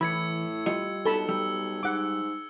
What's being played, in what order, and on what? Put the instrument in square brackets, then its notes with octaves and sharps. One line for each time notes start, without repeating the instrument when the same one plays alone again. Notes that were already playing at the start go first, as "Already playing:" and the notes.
[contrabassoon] A2 [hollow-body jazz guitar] E3 [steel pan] B5 [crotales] E6 G#6 C#7
[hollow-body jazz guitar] G3 F4 D#5 [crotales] C#7
[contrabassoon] B1 [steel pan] A4 A5 B5 [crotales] G7
[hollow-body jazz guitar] G3 [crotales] E6
[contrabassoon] G#2 [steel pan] F#5 D6